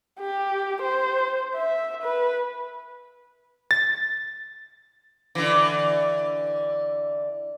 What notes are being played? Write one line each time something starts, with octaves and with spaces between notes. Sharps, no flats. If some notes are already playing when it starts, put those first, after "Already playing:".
G4
C5
E5
B4
A6
D3 E3